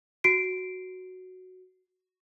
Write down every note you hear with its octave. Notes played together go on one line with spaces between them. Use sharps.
F#4 C7 D7